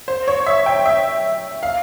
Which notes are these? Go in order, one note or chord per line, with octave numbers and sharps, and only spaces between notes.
C5
C#5
E5
G5
E5
F5